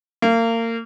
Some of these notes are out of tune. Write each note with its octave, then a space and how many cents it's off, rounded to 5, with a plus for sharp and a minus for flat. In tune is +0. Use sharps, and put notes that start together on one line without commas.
A#3 -30